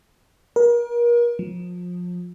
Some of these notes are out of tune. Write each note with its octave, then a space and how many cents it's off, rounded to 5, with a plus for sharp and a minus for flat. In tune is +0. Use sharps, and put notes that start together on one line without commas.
A#4 +35
F3 +30